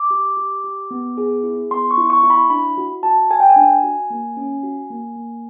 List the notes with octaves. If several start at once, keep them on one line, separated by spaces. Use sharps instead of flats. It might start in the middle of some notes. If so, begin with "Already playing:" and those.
Already playing: D6
G4
G4
G4
B3
G#4
E4
B3 C6
C#6
E4
C#6
E4
B5
D4 B5
F#4
F#4 A5
A4 G#5
G5
G#5
D4
F#4
A#3
C#4
F#4
A#3
A#3